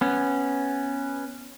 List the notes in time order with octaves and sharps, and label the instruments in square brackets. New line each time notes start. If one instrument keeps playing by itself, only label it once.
[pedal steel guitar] B3 C#4